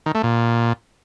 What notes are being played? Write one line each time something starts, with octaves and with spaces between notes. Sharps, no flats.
D#3
A3
A#2